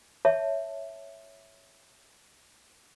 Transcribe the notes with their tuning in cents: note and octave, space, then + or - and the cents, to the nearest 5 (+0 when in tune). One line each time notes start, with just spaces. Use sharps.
C#5 +0 E5 +0 A5 +0